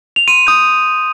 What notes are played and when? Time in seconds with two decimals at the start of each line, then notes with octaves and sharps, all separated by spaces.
0.16 F7
0.28 C6 D#7
0.47 D#6 G6